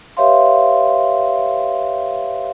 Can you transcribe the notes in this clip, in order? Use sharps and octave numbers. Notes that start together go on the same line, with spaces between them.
G4 B4 C#5 E5 F5 C6